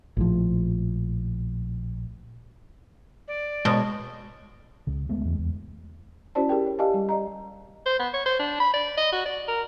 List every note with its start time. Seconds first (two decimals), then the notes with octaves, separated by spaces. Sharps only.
0.17 A#1 A2 F3
3.28 D5
3.65 B2 G#3 A4 C#5
4.87 C#2 C#3
5.09 D2 G#3 A3 B3
5.25 E2 G#3
5.39 E2
6.35 C#4 E4 F#4 C5 D5 A5
6.49 G4 G#4 A#4 G5
6.66 C#5
6.79 G4 D5 D#5 F5 G#5 A5
6.94 G3
7.09 D5 D#5 A#5
7.86 C5
7.99 B3
8.13 C#5
8.26 C5
8.39 D4
8.60 B5
8.73 D5
8.97 D#5
9.12 F#4
9.25 D5
9.48 A#4